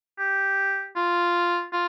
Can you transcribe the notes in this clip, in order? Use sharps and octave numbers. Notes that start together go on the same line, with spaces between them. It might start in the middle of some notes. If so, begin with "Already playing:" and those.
G4
F4
F4